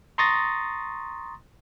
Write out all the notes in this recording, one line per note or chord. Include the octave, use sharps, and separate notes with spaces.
A#5 C6 C#6 D#6 A6 A#6